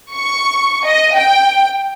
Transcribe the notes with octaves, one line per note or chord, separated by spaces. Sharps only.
C#6
D#5
G5